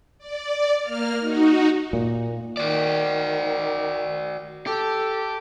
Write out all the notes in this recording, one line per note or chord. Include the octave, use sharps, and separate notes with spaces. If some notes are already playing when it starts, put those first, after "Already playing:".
D5
A#3 F6
D#4 F#4
A#2
D#3 F#4 D5
G4 A4